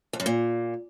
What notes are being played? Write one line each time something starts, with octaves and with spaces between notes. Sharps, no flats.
F2
F#2
A#2